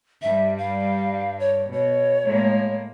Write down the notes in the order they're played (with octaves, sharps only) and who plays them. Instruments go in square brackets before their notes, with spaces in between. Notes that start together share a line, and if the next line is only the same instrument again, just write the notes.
[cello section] G2 G3 [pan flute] E5
[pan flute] F5
C#5
[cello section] B2 [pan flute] C#5
[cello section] A2 G#3 A#3